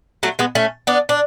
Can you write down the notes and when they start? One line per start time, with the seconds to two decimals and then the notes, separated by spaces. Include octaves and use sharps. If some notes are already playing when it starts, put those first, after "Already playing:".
0.23 F#3 A3
0.39 G#3 B3
0.55 A3 C#4
0.87 B3 D4
1.09 D4